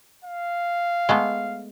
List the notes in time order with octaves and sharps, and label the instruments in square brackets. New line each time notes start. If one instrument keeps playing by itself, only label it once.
[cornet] F5
[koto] G#3 A3 B3